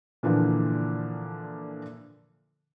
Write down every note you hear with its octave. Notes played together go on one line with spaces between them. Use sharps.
A#2 D3 E3 F3 A#3